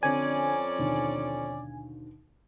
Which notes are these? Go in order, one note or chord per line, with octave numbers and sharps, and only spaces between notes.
F2 D3 C4 C#4 D5 G#5
D#2 B2 D3